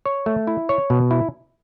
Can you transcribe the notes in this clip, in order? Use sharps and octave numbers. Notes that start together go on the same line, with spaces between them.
C#5
A3
E4
C#5
B2
E4